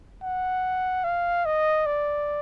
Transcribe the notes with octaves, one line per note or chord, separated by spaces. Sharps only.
F#5
F5
D#5
D5